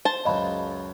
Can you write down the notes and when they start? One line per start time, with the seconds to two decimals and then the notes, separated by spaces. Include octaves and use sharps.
0.05 C5 A5
0.25 C#2 F#2 D#5 F5 B5